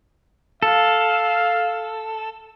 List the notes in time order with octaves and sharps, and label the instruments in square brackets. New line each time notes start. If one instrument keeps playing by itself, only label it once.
[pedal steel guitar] A4 [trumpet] F5